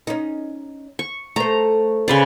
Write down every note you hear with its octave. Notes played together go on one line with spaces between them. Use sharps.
C#4 D#4
C#6
A3 C5 A#5
C#3 B4 C5 D5